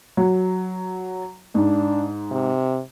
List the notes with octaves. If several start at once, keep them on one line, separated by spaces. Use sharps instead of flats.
F#3
G#2 D4
C3